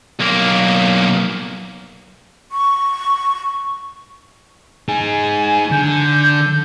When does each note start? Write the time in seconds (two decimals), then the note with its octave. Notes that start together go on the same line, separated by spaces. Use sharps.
0.19 B1 A#3
2.52 C#6
4.88 D#4 G#4 G#5
5.71 D3 G6